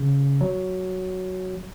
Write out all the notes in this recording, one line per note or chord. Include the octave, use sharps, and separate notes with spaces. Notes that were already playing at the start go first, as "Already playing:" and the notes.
Already playing: C#3
F#3